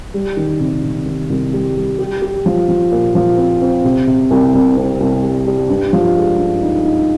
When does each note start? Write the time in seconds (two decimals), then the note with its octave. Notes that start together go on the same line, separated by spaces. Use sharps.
0.14 G3
0.37 D#3
0.60 C3
0.83 C3
1.06 D#3
1.30 C2
1.53 G3
1.76 G3
1.99 G4
2.22 G4
2.46 F3
2.69 F3
2.91 A#2
3.15 F3
3.37 C4
3.61 C4
3.85 C3
4.07 C3
4.31 C2
4.54 C2
4.77 C4
5.00 C2
5.23 G3
5.47 G3
5.69 G2
5.93 F3
6.16 G#3
6.39 G2
6.62 D#4
6.85 D#4